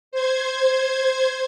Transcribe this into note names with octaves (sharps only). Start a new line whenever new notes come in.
C5 G#6